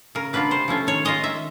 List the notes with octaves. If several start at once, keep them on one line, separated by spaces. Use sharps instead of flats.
C#3 A#4
F#3 A#3 D4 F4 B4
C3 C5
F3 A3 C#4 F4
D#3 C#5
G#3 C#4 F4 D#5
D#3 E5